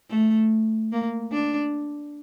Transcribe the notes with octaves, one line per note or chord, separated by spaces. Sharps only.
A3
A#3
D4